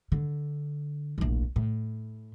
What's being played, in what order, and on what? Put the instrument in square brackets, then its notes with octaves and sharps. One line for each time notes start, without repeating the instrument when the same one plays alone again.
[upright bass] D3
D1 A#1
A2